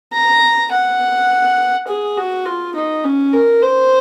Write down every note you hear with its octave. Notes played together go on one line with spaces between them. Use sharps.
A#5
F#5
G#4
F#4
F4
D#4
C#4
A#4
C5